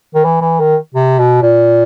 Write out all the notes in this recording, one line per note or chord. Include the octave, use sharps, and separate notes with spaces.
D#3
E3
E3
D#3
C3
B2
A#2